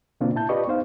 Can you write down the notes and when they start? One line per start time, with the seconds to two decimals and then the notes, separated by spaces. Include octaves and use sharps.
0.21 B2 D3 A#3 C4 D4 F4
0.35 A#2 E4 A5 G6
0.49 F4 G4 B4 D5 D#5 C#6
0.67 B3 D#4 C5 F5